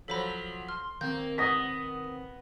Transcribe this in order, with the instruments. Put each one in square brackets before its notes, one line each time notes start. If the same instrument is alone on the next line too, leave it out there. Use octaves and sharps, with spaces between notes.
[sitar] F3 F#3 [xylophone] A4 C5 B5 [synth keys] B6
[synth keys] C6 [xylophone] F6
[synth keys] D#3 C4 [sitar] A#3 [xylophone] G6
[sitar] B3 [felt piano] D#6 A#6 B6